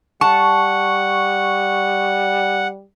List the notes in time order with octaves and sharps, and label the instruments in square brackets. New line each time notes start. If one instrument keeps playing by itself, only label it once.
[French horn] G3 [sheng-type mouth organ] F#5 [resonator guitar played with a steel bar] A5 [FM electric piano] C#6